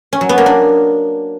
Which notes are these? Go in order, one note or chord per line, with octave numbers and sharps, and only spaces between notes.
C#4
F#3
B3
A#3
D4